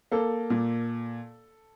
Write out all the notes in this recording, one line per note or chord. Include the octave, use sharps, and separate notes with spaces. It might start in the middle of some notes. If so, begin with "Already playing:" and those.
A#3 A4
A#2